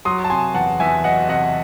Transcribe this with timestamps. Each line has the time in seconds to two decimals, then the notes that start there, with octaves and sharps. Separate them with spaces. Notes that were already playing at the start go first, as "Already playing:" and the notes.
0.05 F#3 C6 D#6
0.24 A5
0.30 C3 G#5 C6
0.54 E2 F#5 A5
0.80 E2 E5 G#5
1.04 F#3 D#5 F#5
1.29 C3 D#5 F#5